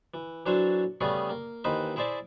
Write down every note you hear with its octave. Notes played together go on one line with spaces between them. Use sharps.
E3
E3 F#3 D4 A4 C5 C#5
C#3 G3 A3 B3 C#4 G#4
A#3
D#2 E3 D#4 B4 C5
E4 G#4 C5 D5 E5 A5